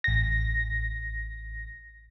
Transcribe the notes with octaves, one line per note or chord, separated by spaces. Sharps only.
A1 A#6